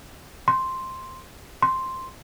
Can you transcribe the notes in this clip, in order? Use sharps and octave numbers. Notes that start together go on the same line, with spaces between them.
C6
C6